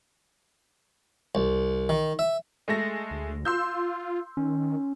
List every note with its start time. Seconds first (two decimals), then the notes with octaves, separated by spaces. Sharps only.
1.35 C2
1.89 D#3
2.19 E5
2.68 G#3 A3 A#6
3.11 D2
3.45 F4 C6 E6 G6
4.37 D#3 C#4